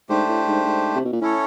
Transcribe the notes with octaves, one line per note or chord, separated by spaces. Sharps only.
G#2 A3 D4 G4 C5
A2
G#2
G#2
C3
B2
A#2
A2 C#4 E4 A4 C#5